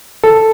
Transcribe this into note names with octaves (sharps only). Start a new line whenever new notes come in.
A4